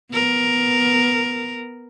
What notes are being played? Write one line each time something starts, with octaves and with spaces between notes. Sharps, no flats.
B3 A#4